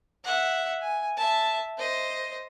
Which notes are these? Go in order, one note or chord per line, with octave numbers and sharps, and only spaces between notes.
E5 F#5
G#5
E5 A5
C5 D#5